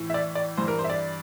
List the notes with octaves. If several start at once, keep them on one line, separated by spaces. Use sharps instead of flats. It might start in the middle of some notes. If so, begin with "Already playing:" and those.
Already playing: A2 E3
E5
D5
D5
G2 E3 C5
A#4
C5
E5
D5